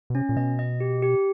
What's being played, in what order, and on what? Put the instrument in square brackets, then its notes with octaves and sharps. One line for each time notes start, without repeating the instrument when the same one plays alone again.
[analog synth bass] B2
[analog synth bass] C3 [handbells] C#4
[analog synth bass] A#2
[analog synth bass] B2 [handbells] D#5
[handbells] D#5
G4
G4